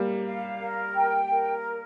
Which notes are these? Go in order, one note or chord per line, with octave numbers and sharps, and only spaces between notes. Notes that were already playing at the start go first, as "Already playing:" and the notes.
Already playing: G3 A#3
F5
A#4
G5
A#4